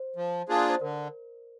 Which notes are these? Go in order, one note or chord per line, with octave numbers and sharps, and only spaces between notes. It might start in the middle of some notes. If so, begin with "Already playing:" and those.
Already playing: C5
F3
A#3 D4 F4 G#4
D5
C5
D3 A#4